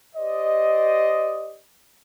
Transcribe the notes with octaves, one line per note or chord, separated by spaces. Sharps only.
G4 C5 D5 D#5